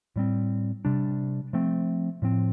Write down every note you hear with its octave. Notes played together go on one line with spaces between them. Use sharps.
A2 G3 C4
C3 G3 D4
F3 A3 C4
A2 F3 C4